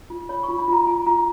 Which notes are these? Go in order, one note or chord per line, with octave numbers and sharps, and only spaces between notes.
F4
C#5 B5
F4 C#6
B5
F4 A#5
F4 G#5
F4 A#5